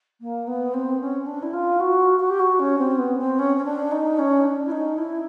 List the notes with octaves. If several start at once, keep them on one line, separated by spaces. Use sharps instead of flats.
A#3
B3
C4
C#4
D4
E4
F4
F#4
F#4
G4
F#4
C#4
C4
B3
C4
C#4
C#4
D4
D#4
C#4
D4
E4
D#4
E4